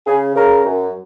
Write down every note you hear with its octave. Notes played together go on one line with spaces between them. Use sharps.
C#3 G#4
C#3 A#4
F#2